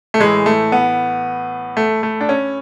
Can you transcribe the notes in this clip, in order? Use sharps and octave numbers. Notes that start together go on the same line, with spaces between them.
A3
A2 E3 G#3
A3
B3
A3
A3
D4
C#4